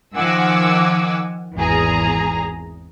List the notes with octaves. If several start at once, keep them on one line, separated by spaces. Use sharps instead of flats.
D#3 F3 F#5 G#5 D6 E6
G#1 E2 G#4 A#5